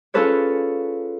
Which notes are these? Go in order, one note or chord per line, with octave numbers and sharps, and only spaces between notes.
C#4 F4 G#4 A4 B4 C#5